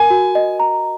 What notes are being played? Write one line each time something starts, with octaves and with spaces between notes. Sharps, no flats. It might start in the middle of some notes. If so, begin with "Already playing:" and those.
Already playing: A#4 G#5
F#4
D#5
A#5